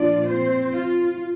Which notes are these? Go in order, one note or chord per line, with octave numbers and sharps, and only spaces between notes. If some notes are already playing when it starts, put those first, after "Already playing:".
Already playing: A#2 F3 D4 F4 D5
C4 C5
F4